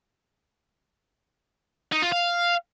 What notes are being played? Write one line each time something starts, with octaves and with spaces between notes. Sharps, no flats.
D#4
F4
F5